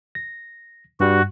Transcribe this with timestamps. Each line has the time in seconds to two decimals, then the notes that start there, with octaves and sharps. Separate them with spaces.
0.15 A#6
1.00 G2 G3 F#4